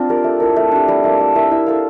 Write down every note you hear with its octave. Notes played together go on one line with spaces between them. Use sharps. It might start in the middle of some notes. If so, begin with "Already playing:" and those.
Already playing: C4 D4 F4
G4 A#4 D5
A3
E4 A#4
A3
D4 G4
G3
A#3 E4
A3
E4 A#4 E5
E4
A4 C5 F5